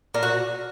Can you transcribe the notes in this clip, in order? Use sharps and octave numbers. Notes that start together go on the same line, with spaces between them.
A#2 A#4
F#4